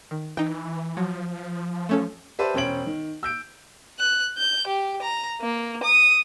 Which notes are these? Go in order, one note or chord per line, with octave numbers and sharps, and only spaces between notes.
D#3
E3 D#4 G5
F3 F#3
A3 C#4 A4
G4 B4 C5 D5 E5 A5
E1 C#4 C5 C#5 D7 F#7
D#3
E6 G6 D7
F#6
G6
G4
A#5
A#3
D#6